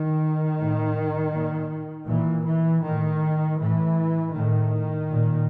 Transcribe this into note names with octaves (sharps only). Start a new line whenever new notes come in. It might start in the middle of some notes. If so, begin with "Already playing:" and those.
Already playing: D#3
A2
A#2
A#2 E3
E3
A2 D#3
A2 E3
A2 D#3
A#2